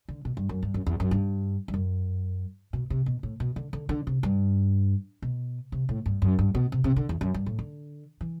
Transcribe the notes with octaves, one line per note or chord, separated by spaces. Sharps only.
D3
B2
G2
F#2
G2
F#2
E2
F#2
G2
G2
F#2
B2
C3
B2
A2
B2
D3
D3
D3
C3
G2
B2
C3
A2
G2
F#2
G2
B2
C3
C3
D3
E2
F#2
G2
A2
D3
E3